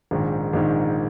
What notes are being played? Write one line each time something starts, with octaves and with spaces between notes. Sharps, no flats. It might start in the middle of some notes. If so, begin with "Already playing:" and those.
A#1 G#2 D#3
A#1 G#2 D#3